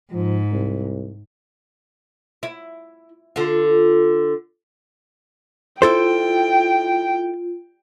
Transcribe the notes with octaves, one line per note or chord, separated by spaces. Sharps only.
G#2 F3
C2
E4
D3 F4
E4 F4 A4 C5 G5